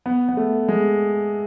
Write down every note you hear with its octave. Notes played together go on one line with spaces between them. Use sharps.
B3
B3
A3
G#3